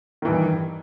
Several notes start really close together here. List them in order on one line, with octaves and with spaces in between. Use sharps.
D#3 E3 G2